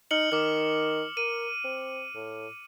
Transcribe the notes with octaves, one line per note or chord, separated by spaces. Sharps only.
D#4 F6 C#7 F#7
D#3 D6 F6
A#4 D#7
C4
A2